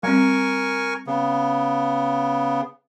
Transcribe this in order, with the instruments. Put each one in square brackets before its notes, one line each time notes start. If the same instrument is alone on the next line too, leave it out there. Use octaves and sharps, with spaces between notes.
[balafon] G3 C4 [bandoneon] A#4 G#5 C#6
[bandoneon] C#3 B3